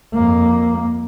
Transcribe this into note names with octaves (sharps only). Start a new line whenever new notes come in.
F2 A#3